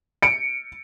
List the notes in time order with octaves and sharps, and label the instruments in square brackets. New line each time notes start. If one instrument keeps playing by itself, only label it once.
[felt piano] C#7 D7